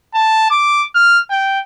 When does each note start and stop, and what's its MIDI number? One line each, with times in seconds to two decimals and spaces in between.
0.15 0.48 81
0.51 0.85 86
0.95 1.21 89
1.30 1.60 79